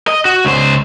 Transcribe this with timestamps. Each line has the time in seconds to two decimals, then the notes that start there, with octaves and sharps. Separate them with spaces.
0.08 D#5
0.25 F#4
0.45 C#2 C5